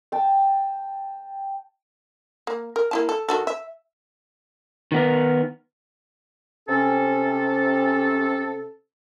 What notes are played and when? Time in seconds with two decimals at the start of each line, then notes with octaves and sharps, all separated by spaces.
0.12 G5 A5
2.47 A#3
2.76 A#4
2.91 A#3 E4 A5
3.09 A4
3.29 D#3 F#4 A4
3.47 E5
4.92 D#3 B3 A#4
6.69 C3 C#4 A4